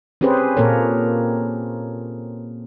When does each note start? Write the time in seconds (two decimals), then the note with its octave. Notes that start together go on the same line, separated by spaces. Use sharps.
0.21 C4 C#4 G4 G#4 B4 C5
0.57 A#2 A#3 A4 A#4 C#5